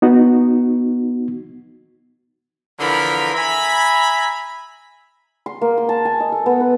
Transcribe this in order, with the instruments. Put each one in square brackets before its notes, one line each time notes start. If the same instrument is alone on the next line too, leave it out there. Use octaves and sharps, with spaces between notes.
[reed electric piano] B3 D#4 F#4
[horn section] D3 E3 F3 A#4 B5
E5 G#5 A#5 B5
[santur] C6
A#3
C6
A5
G#5
D#5
A4
B3
B4